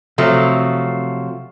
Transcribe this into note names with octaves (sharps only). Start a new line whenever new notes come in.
C3 F3 F#3 A3